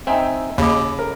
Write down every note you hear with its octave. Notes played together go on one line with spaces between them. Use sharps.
C4 D#4 E5 G5 G#5
D#2 C#3 D#5 B5 D6
A#4